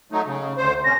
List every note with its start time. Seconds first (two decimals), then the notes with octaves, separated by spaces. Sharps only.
0.12 F#3 A3 D#4
0.26 C#3
0.57 D2 C5
0.84 C3 C#4 A#6